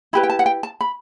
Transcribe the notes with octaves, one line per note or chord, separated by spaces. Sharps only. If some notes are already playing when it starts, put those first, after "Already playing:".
E4 G4 B4 B5
G5
A5
F#5
G5
A5
B5